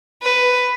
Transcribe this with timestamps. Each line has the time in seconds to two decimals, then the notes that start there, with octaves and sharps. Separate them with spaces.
0.22 B4